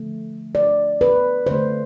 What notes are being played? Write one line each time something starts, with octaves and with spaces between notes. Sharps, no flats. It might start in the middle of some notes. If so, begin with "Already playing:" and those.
Already playing: D3 F3 A3
D5
B4
D3 A3 C5